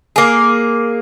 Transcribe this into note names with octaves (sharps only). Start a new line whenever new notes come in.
A#3 G#4